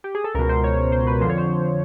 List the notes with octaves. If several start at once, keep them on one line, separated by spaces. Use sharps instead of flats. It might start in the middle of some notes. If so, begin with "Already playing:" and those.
G4
G#4
A4
C#2 B2 A#4
C5
C#5
C#5
C5
B4
F2 D3 F3 C5
C#5
C5